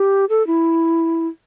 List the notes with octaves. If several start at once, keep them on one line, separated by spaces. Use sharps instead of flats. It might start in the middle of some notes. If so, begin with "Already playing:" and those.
Already playing: G4
A4
E4